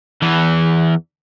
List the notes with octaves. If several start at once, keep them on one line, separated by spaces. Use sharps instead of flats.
E2 E3